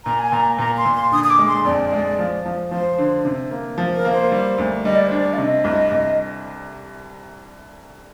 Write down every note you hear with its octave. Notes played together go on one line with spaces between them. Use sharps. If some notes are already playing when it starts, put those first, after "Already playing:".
A#2 A#5
G#5
A#2 A#5
A#2 A#5
C6
A#2
C6
D3 D#6
D#6
D6
G#3
C6
F2 D5
G#3
F3
F3
F3 C5
D3
C3
A#3
F3
A#4
A#3
C5
G3
D2
G3 D#5
D5
D4 C5
D5
F5
C3 D#5
C2
C2